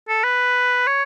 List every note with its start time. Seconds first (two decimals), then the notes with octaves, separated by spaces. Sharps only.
0.09 A4
0.24 B4
0.87 C#5